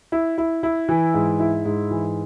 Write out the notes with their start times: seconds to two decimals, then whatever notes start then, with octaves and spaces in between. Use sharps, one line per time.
0.12 E4
0.38 E4
0.63 E4
0.89 E3
1.14 G#2
1.40 E4
1.65 G#2
1.91 E3